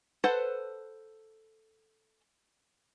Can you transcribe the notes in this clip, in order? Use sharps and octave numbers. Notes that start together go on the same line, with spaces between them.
A4 B4 C5 F#5